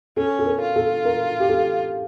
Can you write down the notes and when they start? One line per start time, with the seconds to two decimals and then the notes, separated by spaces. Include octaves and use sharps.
0.17 C#4 A4
0.39 A4
0.46 A#4
0.61 F4
0.76 A4
1.05 A#4
1.40 G4
1.49 A4